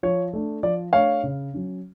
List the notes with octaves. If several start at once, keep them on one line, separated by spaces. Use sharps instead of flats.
F3 C#5
A3 D4
F3 D5
A3 D4 C#5 F5
C#3
F#3 C#4